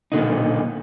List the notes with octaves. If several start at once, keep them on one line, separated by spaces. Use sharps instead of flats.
B1 A#2 D3 D#4